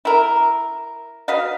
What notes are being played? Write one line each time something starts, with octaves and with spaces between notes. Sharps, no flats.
E4 A#4
F#4 B4 D#5 F5